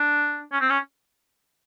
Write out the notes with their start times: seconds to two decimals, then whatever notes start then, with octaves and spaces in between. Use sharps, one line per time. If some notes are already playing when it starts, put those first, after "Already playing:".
Already playing: D4
0.52 C#4
0.61 C4
0.70 C#4